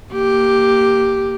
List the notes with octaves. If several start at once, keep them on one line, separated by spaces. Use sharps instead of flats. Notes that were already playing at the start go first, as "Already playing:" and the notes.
A#3 G4